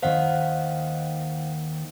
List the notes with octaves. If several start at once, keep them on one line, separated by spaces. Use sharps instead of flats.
D#2 D#3 D#4 C5 F5 F#5